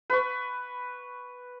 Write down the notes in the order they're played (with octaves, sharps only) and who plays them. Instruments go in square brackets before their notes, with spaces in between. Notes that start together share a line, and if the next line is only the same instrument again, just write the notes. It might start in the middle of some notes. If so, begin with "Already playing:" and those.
[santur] B4 C#6